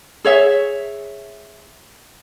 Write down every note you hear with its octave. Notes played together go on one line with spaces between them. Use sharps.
G#4 C#5 E5